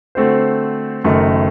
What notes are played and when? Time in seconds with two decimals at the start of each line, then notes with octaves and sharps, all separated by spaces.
0.15 D3 A3 C4 F#4 C5
1.04 F#1 F#2 D#3 A3